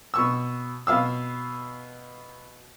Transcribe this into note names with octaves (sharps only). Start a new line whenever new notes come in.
B2 C#6 E6
B2 F5 E6